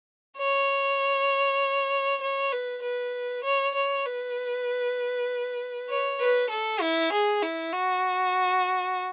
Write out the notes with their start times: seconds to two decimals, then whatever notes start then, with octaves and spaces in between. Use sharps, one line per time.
0.38 C#5
2.21 C#5
2.52 B4
2.82 B4
3.44 C#5
3.75 C#5
4.05 B4
5.89 C#5
6.20 B4
6.50 A4
6.81 E4
7.12 G#4
7.42 E4
7.73 F#4